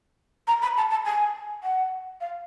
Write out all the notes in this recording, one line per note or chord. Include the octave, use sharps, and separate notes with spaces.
A#5
B5
A5
A5
G#5
F#5
F5